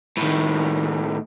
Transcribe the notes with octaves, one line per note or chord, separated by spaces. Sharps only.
A2 D#3